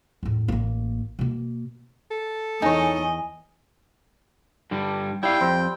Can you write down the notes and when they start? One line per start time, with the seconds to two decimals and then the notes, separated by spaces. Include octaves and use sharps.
0.23 E2 A2
0.48 A1 A#3
1.19 B2 A#3
2.11 A4
2.62 E2 D#4 C#5 D#5 G#5
4.71 G2 D3 G3
5.23 G3 E4 F5 G5
5.41 F2 C4